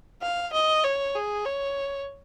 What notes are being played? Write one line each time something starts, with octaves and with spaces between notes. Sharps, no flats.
F5
D#5
C#5
G#4
C#5